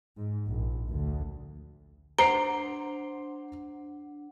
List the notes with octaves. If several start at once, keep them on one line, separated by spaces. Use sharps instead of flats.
G#2
A#1
D2
D4 C5 F#5 A#5 C7 D7